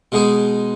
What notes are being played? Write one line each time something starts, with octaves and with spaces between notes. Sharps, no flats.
B2 G#3 D#4 G#4